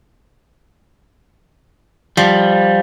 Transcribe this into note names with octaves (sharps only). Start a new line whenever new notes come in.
F3 G3